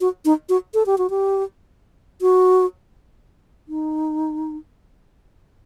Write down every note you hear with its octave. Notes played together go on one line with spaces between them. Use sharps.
F#4
D#4
F#4
A4
G4
F#4
G4
F#4
D#4